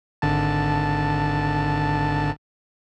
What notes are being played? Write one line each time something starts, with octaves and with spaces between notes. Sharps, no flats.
G#1 D3 A5